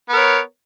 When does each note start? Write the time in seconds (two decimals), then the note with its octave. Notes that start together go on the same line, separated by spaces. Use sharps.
0.09 B3
0.13 A#4
0.17 C#5